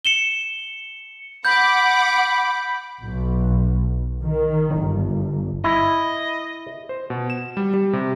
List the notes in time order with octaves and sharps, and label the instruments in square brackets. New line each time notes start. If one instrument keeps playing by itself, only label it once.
[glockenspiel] C#7 E7 G7
[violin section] F#5 D6 [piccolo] B5 [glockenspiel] G6
[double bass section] B1
D#3
G1
[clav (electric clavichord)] E4 [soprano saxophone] D#5
[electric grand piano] C5
B2
E7
G3
G3
C3